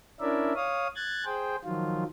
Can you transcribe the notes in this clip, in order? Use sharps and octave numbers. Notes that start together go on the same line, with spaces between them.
C#4 D4 E4 A#4 D5 E5
C#5 F5 D#6
F#6 G#6 A6
G#4 C5 G5
D#3 F3 F#3 F4